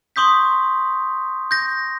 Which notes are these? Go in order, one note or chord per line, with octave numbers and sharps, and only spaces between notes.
C6 C#6 D#6 G6 B6
G6 A#6